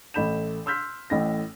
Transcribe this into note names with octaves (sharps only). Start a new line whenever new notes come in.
A1 A3 B5 G6 E7
C6 E6 F6 G6 B6
A1 A2 A#6